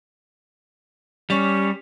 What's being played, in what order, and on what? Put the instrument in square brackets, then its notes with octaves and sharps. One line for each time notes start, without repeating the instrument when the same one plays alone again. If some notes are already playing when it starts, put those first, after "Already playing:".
[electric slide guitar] G3 [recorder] C#4